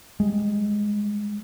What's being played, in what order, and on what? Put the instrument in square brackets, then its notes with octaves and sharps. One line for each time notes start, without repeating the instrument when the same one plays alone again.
[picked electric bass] G3 G#3